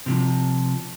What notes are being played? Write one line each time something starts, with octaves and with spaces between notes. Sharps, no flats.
C3 E3 F3